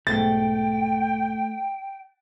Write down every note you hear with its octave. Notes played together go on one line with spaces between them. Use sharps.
B1 G#2 A3 G5 A6